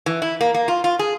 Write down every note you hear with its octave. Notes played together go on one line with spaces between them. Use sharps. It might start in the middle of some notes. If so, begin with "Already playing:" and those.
E3
E4
A#3
A#3
F4
F4
G#4